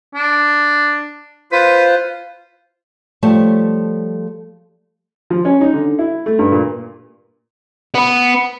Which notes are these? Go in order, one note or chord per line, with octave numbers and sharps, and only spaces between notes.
D4
F4 B4 C5
F3 G3 A3 C#5 A5
F3
C#4
D#4
D3
E4
A3
G2
A#2
B3 B4